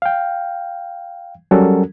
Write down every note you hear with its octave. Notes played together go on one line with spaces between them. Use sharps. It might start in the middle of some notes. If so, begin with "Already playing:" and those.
F5 G5
F#3 G3 C#4 F#4 A4 A#4